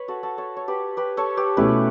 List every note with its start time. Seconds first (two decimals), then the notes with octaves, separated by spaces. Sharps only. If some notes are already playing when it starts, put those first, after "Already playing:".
Already playing: B4 C#5
0.08 F#4 A4
0.23 F#4 A4
0.38 A4 C#5
0.57 C#5
0.68 G4 B4
0.97 G4 B4
1.17 A4 C#5
1.37 G4 B4
1.57 B2 A3 C#4 E4 G4 B4